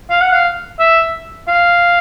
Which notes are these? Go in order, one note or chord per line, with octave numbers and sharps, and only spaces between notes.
F5
F#5
F5
E5
F5